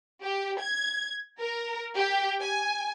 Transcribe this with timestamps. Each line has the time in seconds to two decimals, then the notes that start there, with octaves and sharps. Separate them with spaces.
0.24 G4
0.60 G#6
1.40 A#4
1.95 G4
2.41 G#5